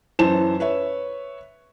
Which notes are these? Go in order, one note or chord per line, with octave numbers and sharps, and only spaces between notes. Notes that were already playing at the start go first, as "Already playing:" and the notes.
F#2 E3 C5 A5 E7
B4 C#5 E5